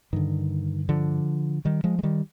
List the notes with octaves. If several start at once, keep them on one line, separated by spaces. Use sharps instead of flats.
G2 D3 D#3
D3 F3
D#3 G3
F3 G#3
G#3
D#3 G3